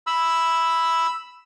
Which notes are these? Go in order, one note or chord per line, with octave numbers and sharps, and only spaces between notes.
B5 E6